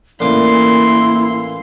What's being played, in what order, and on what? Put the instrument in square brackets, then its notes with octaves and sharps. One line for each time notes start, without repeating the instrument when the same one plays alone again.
[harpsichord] A1 A#2 D6 [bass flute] A#3 [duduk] E4 [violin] C6